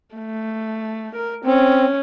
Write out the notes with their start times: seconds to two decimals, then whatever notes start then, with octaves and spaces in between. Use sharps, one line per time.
0.16 A3
1.15 A#4
1.45 C4 C#4